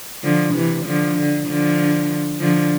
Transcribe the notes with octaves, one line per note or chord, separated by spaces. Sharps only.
D3 F3
C3 E3
D3 F3
D3
D3 F3
D3 F3